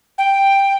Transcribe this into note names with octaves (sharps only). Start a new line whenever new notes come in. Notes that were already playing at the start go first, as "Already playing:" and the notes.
G5